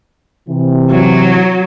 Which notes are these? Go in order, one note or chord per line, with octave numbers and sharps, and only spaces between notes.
C3 E3
F#3